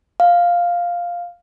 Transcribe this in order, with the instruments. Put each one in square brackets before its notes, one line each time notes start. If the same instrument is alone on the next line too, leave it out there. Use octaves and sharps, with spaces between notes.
[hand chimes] F5